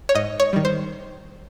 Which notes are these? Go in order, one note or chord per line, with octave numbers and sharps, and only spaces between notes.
C#5
G#2 D#5
C#5
D#3 G3
C5